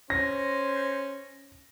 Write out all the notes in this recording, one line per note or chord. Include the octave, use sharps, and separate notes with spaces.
C#4 C5 A#6